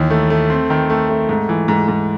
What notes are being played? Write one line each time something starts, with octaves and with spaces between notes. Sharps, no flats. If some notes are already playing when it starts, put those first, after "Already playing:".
Already playing: D#2 E3 D#4
A3
A3
C4
D#3
A3
A3
G#2
E3
G#2
G#2